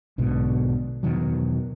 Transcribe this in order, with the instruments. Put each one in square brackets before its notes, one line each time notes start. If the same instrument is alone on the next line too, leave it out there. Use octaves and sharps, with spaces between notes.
[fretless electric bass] B1 G#2 B2 D3
E2 B2 D#3 F#3